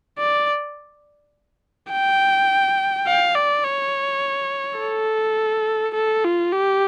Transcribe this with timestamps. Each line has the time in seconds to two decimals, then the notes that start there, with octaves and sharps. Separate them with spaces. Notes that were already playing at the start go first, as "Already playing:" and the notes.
0.19 D5
1.92 G5
3.07 F5
3.35 D5
3.64 C#5
4.79 A4
5.94 A4
6.24 F4
6.52 G4